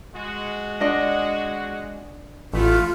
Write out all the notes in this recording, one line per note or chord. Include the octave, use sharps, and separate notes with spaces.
G#3 F#4
D4 D#5 F#5
A1 A3 B3 F4